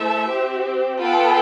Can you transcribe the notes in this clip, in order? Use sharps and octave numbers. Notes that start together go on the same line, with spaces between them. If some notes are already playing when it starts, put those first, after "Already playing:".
Already playing: A3 E4 A4 C5 E5
C4 G4
B3 F4 A4 G5 B5